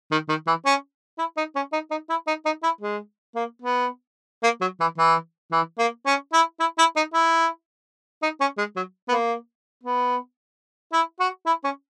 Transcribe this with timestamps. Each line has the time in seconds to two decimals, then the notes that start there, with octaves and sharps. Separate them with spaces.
0.11 D#3
0.29 D#3
0.47 E3
0.65 C#4
1.18 E4
1.37 D#4
1.55 C#4
1.73 D#4
1.91 D#4
2.09 E4
2.27 D#4
2.45 D#4
2.63 E4
2.81 G#3
3.35 A#3
3.62 B3
4.43 A#3
4.61 F#3
4.80 E3
4.98 E3
5.52 E3
5.79 A#3
6.06 C#4
6.33 E4
6.60 E4
6.78 E4
6.96 D#4
7.14 E4
8.22 D#4
8.40 C#4
8.57 G#3
8.76 F#3
9.08 B3
9.12 A#3
9.84 B3
10.92 E4
11.20 F#4
11.46 E4
11.64 C#4